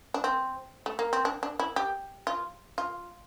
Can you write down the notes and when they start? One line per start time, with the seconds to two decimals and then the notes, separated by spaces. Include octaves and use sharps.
0.14 D4
0.24 C4
0.86 A3
0.99 A#3
1.13 C4
1.25 D4
1.43 D4
1.59 E4
1.76 G4
2.27 F4
2.78 F4